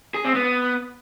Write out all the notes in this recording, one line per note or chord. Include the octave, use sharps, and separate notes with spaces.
G#4
C4
B3